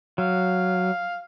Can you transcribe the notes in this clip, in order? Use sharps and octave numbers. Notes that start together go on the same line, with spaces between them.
F#3 F5